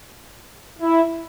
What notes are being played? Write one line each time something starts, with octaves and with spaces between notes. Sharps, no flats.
E4